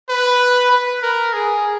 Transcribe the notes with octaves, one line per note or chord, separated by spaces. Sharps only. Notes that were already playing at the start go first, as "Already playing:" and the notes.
B4
B4
A#4
G#4